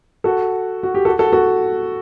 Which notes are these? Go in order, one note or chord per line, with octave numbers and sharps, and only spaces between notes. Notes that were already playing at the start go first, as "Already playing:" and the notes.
F#4 A4
F#4
G4
F#4 A4
F#4 A4
F#4 A4